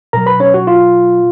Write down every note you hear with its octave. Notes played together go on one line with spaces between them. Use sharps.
B2 F#3 A#4 A#5
B4 B5
C#4 C#5
F#4
F4